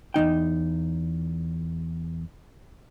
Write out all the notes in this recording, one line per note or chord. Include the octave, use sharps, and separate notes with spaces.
E2 F#3 D#4 G5